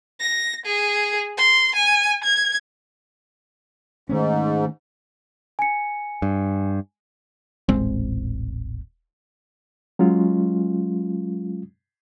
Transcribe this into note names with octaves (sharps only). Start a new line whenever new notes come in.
A#6
G#4
C6
G#5
G#6
G#2 D#3 A3 C#4
G#5 C#7
G2
D#1 A1 G#3 C4
F#3 G#3 C#4 F4